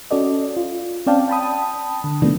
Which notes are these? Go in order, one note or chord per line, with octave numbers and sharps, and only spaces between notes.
C#4 F#4 A4 D5 D#5
F4
C4 C#4 D5 F5 G5 A5
G5 A5 B5 D#6
D3
C3 D#3 F3 A3 B3 D4